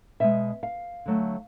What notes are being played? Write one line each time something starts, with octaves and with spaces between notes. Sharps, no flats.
B2 G#3 E5
F5
D3 F#3 A3